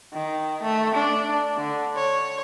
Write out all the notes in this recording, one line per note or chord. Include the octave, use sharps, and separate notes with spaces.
D#3
A3
D4
D3
C#5